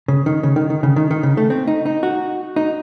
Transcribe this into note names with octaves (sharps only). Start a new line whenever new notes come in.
C#3
D#3
C#3
D#3
D#3
C#3
D#3
D#3
C#3
A3
C4
D#4
D#4
F#4
D#4